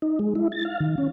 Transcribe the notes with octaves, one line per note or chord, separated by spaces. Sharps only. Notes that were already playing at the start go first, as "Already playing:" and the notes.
D#4
G#3
E4
A6
F5
D#3
C#4